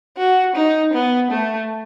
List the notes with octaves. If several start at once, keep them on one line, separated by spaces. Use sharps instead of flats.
F#4
D#4
B3
A3